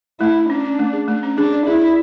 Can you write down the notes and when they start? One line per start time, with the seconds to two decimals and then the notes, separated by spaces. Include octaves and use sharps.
0.20 A3 E4
0.35 A3
0.49 C#4 D4
0.64 C#4
0.79 A3
0.93 G#4
1.08 A3
1.23 C#4
1.38 D4 G#4
1.52 D5
1.66 E4 G#4
1.81 D5